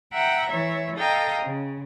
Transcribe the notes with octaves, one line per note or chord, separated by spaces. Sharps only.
E5 F#5 G5 A#5
E3 C#5 E5
A4 D#5 F5 G5 A#5
C#3